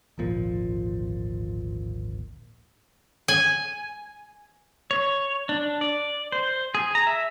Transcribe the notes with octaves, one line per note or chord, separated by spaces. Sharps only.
D1 G#1 A#2 F3
G#5
C#5
D4
D5
C5
G#4
A#5
E5